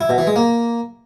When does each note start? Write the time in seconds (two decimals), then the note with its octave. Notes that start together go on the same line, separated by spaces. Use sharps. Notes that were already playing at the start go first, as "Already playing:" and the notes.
0.01 E4
0.09 B2
0.18 E3
0.27 G#3
0.36 A#3